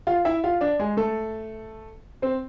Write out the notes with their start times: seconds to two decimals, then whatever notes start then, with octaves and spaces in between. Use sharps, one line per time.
0.07 F4 F5
0.25 E4 E5
0.44 F4 F5
0.61 D4 D5
0.79 G#3 G#4
0.97 A3 A4
2.22 C4 C5